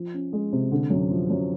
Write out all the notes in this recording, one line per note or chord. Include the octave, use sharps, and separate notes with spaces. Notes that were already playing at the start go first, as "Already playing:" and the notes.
Already playing: F3
C#4
G#3
C3
D3
F#2
F3
F#2